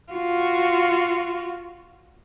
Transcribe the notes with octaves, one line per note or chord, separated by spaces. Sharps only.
F4 F#4